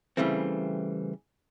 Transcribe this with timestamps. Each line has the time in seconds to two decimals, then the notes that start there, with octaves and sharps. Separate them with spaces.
0.17 C#3 E3 G3 A3 C4